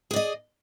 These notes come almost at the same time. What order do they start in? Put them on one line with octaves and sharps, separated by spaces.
G#4 D5 D#5